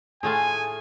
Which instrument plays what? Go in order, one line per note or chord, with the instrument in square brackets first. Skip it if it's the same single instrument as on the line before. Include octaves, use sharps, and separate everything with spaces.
[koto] A2 A3 F4 [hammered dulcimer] G#4 [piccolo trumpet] G#5